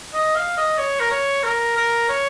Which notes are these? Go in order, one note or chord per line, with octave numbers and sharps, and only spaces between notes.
D#5
F5
D#5
C#5
A#4
C#5
A#4
A#4
C#5